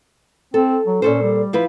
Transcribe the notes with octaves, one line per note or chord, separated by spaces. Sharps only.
C4 A4
F#3
A#2 C#4 A4 C5
G3
F3 E4 B4